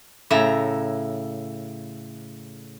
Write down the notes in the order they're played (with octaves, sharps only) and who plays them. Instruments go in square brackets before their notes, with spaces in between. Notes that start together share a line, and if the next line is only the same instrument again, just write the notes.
[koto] A2 C#3 E5 A#5